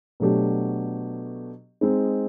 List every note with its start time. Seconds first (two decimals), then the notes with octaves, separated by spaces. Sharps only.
0.20 B2 F#3 A3 D4 G4
1.81 G#3 C4 D#4 G#4